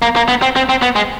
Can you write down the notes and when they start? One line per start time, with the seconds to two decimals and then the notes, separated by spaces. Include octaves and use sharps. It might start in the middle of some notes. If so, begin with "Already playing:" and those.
0.02 A#3
0.16 A#3
0.28 B3
0.42 C4
0.56 C4
0.69 C4
0.82 B3
0.96 G#3